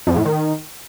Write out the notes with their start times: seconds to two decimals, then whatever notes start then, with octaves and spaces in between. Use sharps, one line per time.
0.07 F2
0.16 A2
0.25 D#3